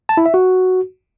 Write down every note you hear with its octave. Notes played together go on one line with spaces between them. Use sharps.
A5
E4
E5
F#4